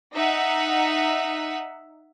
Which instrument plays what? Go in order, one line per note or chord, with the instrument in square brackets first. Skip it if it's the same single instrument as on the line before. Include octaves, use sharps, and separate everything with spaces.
[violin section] D#4 E5 F#5